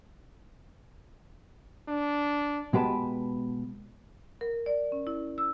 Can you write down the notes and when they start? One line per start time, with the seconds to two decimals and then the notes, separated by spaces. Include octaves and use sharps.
1.88 D4
2.73 B2 G#3 G4 B4 A5
4.41 A#4
4.66 D5
4.92 C#4
5.07 E4
5.38 E6